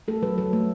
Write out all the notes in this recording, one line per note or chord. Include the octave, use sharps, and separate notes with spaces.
A3 A4
F#3 B4
F#3 A4
A3